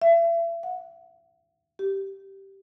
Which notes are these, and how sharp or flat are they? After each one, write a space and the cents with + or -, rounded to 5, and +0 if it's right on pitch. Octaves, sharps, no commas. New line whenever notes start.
E5 +35
F#5 -20
G4 -10